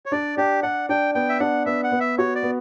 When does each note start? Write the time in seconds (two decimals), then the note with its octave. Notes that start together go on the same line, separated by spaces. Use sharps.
0.06 C#5
0.12 D4 D5
0.37 D4 G4
0.63 D5 F#5
0.89 D4 G5
1.15 B3 G5
1.29 E5
1.40 D4 F#5
1.66 B3 E5
1.84 F#5
1.92 B3
2.00 E5
2.18 F#4 C#5
2.35 D5
2.43 B3